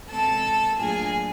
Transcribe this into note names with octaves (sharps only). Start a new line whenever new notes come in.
B2 G#3 C4 A4 A5
A2 F#3 A#3 D4 F4 G#4 G#5